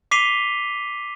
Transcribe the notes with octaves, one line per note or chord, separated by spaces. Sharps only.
D6 B6 C7 D#7 F7 G7